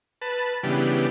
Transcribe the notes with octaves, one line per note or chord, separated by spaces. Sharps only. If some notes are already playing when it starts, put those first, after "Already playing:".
B4 A5
C#3 E3 G3 B3 D4 G4